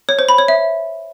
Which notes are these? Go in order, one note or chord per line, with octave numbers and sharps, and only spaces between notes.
C#5
C5
B5
C#5
E5